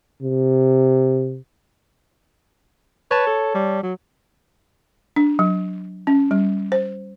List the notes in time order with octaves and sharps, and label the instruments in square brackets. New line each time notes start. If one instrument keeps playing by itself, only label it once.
[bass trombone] C3
[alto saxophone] B4 [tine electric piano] C#5 A5
[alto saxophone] A4
G3
F#3
[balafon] D4
F#3
C#4
G3
C5